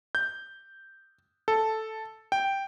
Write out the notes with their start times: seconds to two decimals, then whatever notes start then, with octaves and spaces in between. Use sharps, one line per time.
0.15 G6
1.48 A4
2.32 G5